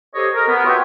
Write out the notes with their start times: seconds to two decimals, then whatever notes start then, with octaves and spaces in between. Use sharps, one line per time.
0.15 G4 A4 C5 C#5 D#5
0.34 A#4
0.48 B3
0.65 F4 F#4 B4 C#5 E5 G5